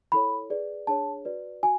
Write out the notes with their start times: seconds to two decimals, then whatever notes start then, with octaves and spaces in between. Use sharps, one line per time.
0.12 E4 A4 C#5 B5
0.50 G#4 B4 D5
0.87 D4 G#4 C#5 A5
1.25 F#4 B4 D5
1.63 F#4 G#5